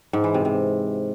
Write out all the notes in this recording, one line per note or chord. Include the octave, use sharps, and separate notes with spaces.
G#2
E3
C3
C3